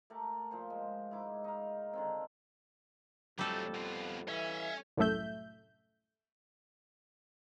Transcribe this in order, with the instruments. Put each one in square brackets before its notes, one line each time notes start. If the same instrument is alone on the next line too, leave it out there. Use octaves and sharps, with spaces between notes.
[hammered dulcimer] A3 G4 A#4 A5
A#2 F3 C5
G#3
G#2 E4 D6
D#4 F5
D3 D#3 C4
[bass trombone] F2 [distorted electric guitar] F#3 A3 [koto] G3 A4
[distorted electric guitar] B2 F4
[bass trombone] E3 [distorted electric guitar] C#4 [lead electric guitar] D#5 E5
[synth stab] C2 F#2 A2 A3 E5 G6